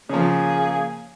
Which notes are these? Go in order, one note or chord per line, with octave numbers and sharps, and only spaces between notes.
C#3 F3 A#3 G#4